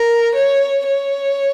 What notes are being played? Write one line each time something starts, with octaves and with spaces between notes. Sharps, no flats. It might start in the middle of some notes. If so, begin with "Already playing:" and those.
Already playing: A#4
C#5
C#5